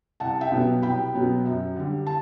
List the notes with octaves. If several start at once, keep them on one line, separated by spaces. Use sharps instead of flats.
C2 F#5 A5
E5 G5
B2 F#3 B3
C2 G5 B5
B2 F#3 B3
F#2
D3 G3
A5